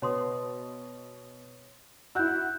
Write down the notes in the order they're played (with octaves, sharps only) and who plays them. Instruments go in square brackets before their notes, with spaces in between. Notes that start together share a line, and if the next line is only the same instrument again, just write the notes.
[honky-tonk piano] B2 [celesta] C#5 C6 D#6
[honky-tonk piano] E4 F#4 [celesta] E6 F#6 G6